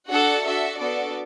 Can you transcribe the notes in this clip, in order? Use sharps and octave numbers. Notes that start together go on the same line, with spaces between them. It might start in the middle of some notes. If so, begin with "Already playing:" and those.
D4 F#4 A4 F#5
D4 F#4 A4 E5
B3 D4 F#4 A4 D5